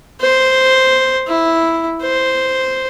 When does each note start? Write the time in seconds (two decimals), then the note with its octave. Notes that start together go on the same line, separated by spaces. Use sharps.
0.21 C5
1.27 E4
2.02 C5